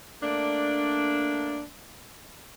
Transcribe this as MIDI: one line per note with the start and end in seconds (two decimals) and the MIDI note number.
0.22 1.63 57
0.22 1.63 58
0.22 1.63 62